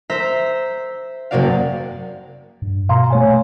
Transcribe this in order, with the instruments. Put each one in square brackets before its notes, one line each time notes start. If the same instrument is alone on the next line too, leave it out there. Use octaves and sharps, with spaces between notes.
[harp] C5 E5 A#5 E6 B6
F#1 C3 A#3 F#4 D5 F5
[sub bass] G2
[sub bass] B2 [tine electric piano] F5 A#5 C6
[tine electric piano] A3 C#5 G#5